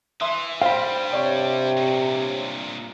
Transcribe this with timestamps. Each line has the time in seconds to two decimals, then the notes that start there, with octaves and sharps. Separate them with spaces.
0.21 E3 E5 C6
0.62 G2 G3 C5 F5 G5 B5
1.11 C3 C#5 D5 G5
1.77 G2 A#2